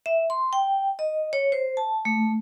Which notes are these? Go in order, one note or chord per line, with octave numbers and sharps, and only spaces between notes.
E5
C6
G5
D#5
C#5
C5
A5
A3